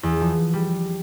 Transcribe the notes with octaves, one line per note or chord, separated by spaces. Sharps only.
E2
F3
G3